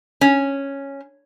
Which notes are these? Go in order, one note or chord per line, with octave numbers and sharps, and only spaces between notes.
C#4